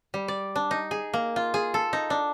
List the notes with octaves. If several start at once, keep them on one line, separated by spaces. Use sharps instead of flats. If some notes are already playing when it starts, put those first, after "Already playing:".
G3
D5
D4
D#4
G#4
A#3
F4
G#4
A4
D#4
D4